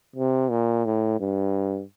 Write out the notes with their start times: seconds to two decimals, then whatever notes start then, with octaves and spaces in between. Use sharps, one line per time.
0.16 C3
0.50 A#2
0.85 A2
1.20 G2